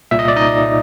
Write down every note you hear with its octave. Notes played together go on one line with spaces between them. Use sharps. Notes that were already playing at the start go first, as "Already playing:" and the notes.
C2 A#2 E5
D#5
D5
D#4 D#5